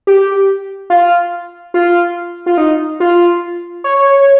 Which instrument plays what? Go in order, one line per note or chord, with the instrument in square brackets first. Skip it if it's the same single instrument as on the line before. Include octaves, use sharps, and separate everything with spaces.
[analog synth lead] G4
F4
F4
F4
D#4
F4
C#5